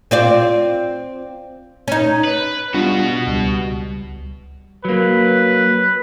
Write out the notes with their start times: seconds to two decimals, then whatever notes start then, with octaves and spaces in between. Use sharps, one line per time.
0.11 C4 F4 D5
1.88 C#4 D#4
2.24 B4
2.74 B2 G3 D4 F4 F#4
3.27 C#2 G3
4.85 F#3 A#3 B4